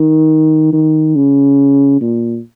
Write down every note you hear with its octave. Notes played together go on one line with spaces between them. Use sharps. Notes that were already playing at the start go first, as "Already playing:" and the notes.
Already playing: D#3
D#3
C#3
A#2